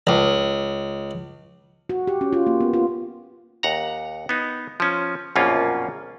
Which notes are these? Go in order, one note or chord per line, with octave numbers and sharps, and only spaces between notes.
C#2
F#4
G4
C#4
F4
A#3
B3
F4
D#2 F#5 A#5
B3 D#4
F3 C#4
A#1 F#2 B2 A#3 C#4 F4